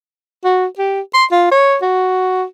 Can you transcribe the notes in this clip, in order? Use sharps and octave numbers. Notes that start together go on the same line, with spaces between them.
F#4
G4
C6
F4
C#5
F#4